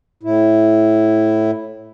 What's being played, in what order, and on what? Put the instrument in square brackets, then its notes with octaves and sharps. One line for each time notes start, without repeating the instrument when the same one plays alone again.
[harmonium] A2 E4